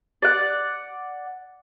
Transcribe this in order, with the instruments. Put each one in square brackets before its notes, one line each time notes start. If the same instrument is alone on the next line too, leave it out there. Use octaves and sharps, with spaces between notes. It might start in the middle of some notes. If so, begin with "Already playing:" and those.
[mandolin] D5 F#5